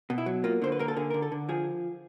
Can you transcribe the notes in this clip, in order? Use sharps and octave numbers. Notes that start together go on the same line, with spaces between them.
B2
E4
F#3
A#3 F4
D3 C5
B4
A#3 A#4
A4
D3 G#4
D3 A#4
A4
D3
F3 G#4